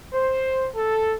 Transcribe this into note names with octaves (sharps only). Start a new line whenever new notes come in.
C5
A4